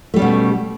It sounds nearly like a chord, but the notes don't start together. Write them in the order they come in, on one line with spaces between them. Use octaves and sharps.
A3 G3 C#4 B2